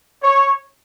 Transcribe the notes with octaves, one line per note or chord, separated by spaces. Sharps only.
C#5